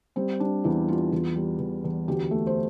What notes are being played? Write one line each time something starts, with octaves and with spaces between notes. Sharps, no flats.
G3 C4
G3 D4
E2 E4
G3 F4
E2 F4
G3
E2
E2
D2 G4
A3
C5